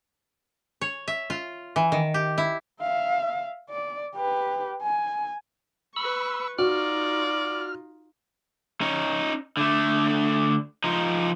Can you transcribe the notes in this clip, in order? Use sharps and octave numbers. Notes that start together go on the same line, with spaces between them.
C#5
E5
F4
E3
D#3
G4
E4
E5 F5
D5
G4 B4
G#5
B4 B5 C#6 E6
D#4 F4 F#4 D5 F6
C#4 D#4
D3 A3
F3 D#4